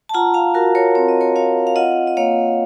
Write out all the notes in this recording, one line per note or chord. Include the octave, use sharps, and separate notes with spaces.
A5
F4 F#5 A#5
F5 A5
F4 F#4 A#4
A#4 C#5
C4 C#5
D#5
A#4 C#5
F4 C#5 F5
F5
F4 D#5 F#5
D#5
A#3 C#5 F5